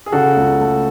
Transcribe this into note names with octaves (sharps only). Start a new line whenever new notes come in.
G#4
C#3 F#4 A4
C#2
A3